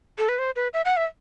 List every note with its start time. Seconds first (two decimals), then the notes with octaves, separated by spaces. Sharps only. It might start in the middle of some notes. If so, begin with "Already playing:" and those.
0.18 A4
0.29 B4
0.39 C5
0.56 B4
0.73 E5
0.85 F#5
0.97 E5